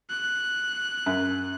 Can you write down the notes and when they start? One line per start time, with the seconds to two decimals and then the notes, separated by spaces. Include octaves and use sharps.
0.10 F#6
1.06 F#2